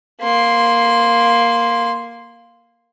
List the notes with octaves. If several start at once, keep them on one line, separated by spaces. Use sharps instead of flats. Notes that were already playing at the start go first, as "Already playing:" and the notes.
A#3 C6